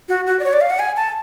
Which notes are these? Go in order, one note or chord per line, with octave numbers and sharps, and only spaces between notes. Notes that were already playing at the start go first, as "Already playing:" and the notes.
F#4
F#4
D5
C#5
D5
F5
F#5
G#5
A5